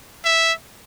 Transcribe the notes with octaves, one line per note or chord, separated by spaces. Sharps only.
E5